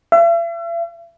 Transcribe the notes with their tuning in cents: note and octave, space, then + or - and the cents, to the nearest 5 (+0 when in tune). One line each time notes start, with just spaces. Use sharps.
E5 +45